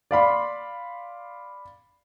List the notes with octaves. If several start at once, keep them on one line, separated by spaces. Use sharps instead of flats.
D5 F5 B5 C6